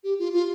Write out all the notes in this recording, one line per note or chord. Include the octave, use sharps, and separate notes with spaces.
G4
F4
F4